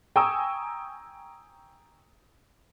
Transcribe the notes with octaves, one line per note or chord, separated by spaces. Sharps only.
G5 G#5 A#5 C#6 D#6 E6